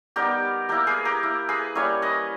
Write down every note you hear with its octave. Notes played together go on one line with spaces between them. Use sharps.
G3 B3 D#4 G4 A#4
A#3 E4 G4 A#4
G#4 B4
G4 A#4
A#3 E4
G#4 B4
G3 A#3 C#4 E4 A#4 C#5
B4 D#5